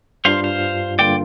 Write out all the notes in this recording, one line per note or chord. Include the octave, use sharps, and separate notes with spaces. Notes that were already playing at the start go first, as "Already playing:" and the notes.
G2 G3 D4 F4 C5 F5
C5 F5
G2 D3 A#3 F4 D5 G5